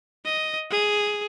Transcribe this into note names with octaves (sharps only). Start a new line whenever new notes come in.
D#5
G#4